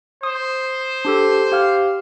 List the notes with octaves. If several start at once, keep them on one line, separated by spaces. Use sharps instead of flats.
C5 D#6
D4 G4 A4
G4 F5 F6